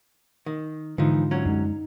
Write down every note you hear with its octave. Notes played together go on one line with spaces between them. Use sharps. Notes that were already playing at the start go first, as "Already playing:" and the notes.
D#3
G#2 D3 E3 F3 D#4 F4
D2 F#3 C#4
F#2 G#3 D#4